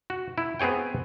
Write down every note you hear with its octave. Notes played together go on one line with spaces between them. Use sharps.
F#4
E4
B3 C4 G#4 C#5 G5